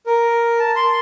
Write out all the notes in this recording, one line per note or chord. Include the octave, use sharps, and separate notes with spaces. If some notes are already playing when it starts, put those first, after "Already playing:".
A#4
A5
C6